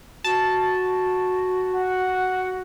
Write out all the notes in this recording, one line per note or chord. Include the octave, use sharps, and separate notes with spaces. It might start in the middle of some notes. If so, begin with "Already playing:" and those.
F#4 A5
F#5